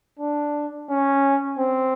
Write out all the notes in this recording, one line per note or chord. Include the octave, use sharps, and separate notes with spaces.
D4
C#4
C4